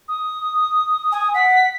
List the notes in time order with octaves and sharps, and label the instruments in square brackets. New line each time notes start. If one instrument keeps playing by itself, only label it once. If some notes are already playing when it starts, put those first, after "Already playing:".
[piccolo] D#6
[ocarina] G#5
[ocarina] F#5 [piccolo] B6